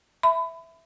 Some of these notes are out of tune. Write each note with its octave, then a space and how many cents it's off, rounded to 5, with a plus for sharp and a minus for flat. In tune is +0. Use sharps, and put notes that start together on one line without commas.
E5 +0 B5 +30